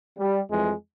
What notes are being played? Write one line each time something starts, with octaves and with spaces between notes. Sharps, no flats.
G3
F2 E3 G3 G#3